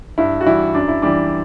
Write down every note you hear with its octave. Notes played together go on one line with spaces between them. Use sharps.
G2 E4
F#4
E3 G3 E4
F#2 D4
E4
E3 G3 D4